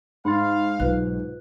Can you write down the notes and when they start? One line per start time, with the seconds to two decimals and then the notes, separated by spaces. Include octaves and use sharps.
0.25 G#2 F5 B5 C6 A6
0.80 B1 F4 B4 F#6